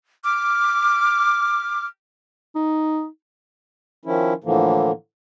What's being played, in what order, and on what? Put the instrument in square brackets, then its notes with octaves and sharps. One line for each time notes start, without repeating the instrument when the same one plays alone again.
[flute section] D6 F6
[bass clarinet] D#4
[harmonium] D#3 F3 C#4 E4
A2 D3 E3 F3 A#3